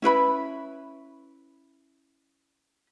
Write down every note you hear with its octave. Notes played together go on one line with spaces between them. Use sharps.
C#4 E4 B4 B5